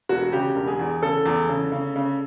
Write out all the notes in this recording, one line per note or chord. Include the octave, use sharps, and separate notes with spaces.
E1 F#4
C#3 G4
E1
G#4
E2
C#3 A4
E2
C#3
C#3
C#3